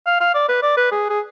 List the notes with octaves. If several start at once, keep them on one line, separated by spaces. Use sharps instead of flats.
F5
F5
D5
B4
D5
B4
G#4
G#4